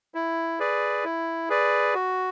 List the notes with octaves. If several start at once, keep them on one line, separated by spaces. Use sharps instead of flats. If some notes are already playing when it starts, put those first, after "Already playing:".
E4
G#4 B4 D5
E4
G#4 B4 D5
F#4